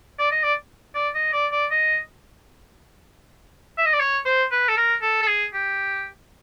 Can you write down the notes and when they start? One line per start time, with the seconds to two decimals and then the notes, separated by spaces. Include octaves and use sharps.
0.19 D5
0.31 D#5
0.43 D5
0.95 D5
1.14 D#5
1.33 D5
1.52 D5
1.71 D#5
3.78 E5
3.86 D#5
3.93 D5
4.00 C#5
4.25 C5
4.51 B4
4.68 A4
4.77 A#4
5.02 A4
5.22 A4
5.27 G#4
5.53 G4